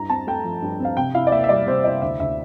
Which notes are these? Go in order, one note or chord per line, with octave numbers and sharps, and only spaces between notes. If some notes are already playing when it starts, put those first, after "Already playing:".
Already playing: G2 E4 A#5
C4 A5
A3 G5
F3
G2
C4 F5
C3 G5
E4 F5
D5
A#3 E5
E5
G3 D5
C3 C5
E4 D5
D2 E5
D2 E5